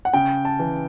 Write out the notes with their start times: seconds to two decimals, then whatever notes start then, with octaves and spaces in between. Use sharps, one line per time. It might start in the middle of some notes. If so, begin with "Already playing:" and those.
0.05 F#5
0.13 C#3 G5
0.45 A5
0.59 E3